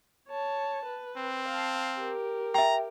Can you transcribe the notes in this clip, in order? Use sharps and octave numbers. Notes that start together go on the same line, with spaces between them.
C#5 A5
B4
C4
F5 A5
G4 A#4
E5 G5 A#5